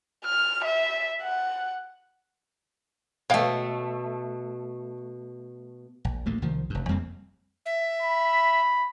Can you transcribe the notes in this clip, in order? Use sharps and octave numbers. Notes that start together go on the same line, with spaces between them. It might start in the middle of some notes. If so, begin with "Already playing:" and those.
F6
E5
F#5
B2 A3 C#5 F5 G5
A#1
D2 A3 A#3
C2 D#3 F3
F1 G2
F2 G3 A#3 C4
E5
B5